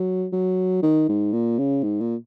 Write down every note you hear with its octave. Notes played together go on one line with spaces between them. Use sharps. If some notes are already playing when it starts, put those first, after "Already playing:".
Already playing: F#3
F#3
D#3
G#2
A#2
C#3
G#2
A#2